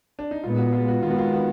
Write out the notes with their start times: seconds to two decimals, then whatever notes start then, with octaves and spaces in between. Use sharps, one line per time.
0.19 D4
0.31 D#4
0.44 A#2 G#3 B3 F4
0.58 F#4
0.73 F4
0.88 F#4
1.03 D#3 G#3 B3 F4
1.10 F#4
1.18 F4
1.33 F#4